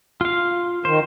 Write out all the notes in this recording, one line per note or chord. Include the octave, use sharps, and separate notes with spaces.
F4 F5
D#3 C5